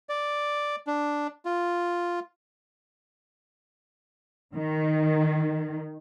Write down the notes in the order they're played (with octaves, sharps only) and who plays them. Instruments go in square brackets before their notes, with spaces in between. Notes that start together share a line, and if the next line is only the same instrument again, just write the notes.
[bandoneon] D5
D4
F4
[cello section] D#3